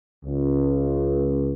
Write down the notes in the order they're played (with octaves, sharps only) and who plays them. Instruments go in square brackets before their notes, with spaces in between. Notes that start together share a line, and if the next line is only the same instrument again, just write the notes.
[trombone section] C#2